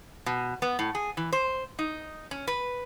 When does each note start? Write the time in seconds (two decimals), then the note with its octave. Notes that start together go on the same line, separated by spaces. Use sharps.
0.26 B2
0.62 B3
0.79 A2
0.95 G#4
1.17 E3
1.32 C5
1.79 D#4
2.31 C#4
2.47 B4